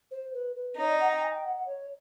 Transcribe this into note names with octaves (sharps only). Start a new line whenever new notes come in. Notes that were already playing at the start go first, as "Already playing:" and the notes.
C5
B4
B4
D#4 C#5
D5
F#5
G5
G#5
G5
F#5
F#5
C#5